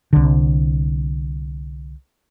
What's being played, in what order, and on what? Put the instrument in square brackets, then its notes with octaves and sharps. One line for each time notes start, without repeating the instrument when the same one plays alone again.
[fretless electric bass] C2 D3